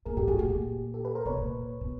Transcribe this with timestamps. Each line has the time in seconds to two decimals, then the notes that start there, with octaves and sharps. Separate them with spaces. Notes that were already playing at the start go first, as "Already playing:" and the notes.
0.05 A#2 G#4 A#4
0.17 A2 G4 A4
0.27 G#2 F#4 G#4
0.39 A2 G4
0.50 A#2
0.94 G4 A4
1.05 A4 B4
1.15 A#4 C5
1.25 B2 B4 C#5
1.37 A#2
1.81 B2